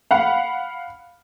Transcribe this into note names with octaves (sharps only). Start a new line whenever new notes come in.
F5 F#5 B5